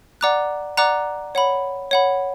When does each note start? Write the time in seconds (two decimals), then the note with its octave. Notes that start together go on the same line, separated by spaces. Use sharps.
0.21 D5 F#5 A#5 D6 F#6
0.77 D5 F#5 A#5 D6 F#6
1.35 C#5 F#5 B5
1.91 C#5 F#5 B5